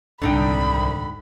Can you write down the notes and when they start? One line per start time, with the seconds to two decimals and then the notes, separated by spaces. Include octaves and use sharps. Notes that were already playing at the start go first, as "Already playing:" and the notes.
0.22 D#1 C2 G#2 D3 D4 D#4 G5 B5